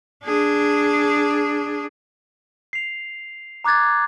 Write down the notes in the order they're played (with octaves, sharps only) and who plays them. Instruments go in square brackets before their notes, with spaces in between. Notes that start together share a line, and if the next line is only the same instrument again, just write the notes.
[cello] D4 G#4
[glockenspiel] C7 F7
A#5 D6 F#6 G#6 A6